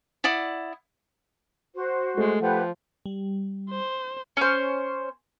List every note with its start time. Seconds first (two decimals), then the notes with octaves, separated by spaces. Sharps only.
0.24 E4 D5 F#5 D#6
1.75 F#4 C5
2.17 G#3 A3
2.41 F3 G4 B4 F#5
3.06 G3
3.70 C5
4.37 C#4 C5